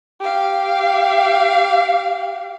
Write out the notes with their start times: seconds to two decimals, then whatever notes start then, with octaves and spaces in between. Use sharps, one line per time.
0.20 G4 F5